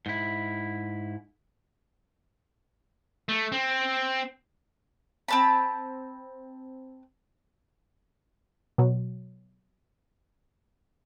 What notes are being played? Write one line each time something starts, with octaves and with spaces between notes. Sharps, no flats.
G#2 E4
A3
C4
C4 A5 B5
B2 F#3